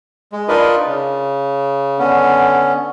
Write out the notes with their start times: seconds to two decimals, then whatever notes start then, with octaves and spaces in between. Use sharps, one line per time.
0.32 G#3
0.48 D4 D#4 F4 A#4 B4 D#5
0.87 C#3
1.99 D3 B3 C#4